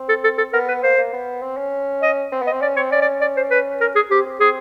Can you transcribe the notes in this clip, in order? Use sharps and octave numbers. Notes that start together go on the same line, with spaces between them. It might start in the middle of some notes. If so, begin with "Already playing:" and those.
Already playing: C4
A4
A4
A4
B3 A#4
B4
A#3 C5
A#3
B3
C4
C#4
D#5
C4
B3
D#5
C4
C#4 D5
C4 C#5
C#4 D5
D5
D5
C5
B4
A#4
G#4
C4 G4
C4
C4 G#4